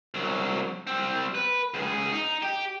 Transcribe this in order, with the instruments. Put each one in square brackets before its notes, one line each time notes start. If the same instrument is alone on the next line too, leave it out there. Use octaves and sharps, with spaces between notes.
[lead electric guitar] C2 F#3
G3 C4
B4
C#2 G#4
D#4
G4